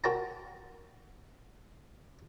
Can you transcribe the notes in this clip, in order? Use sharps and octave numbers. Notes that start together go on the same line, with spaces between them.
F#4 A#4 C5 G5 A5 A#5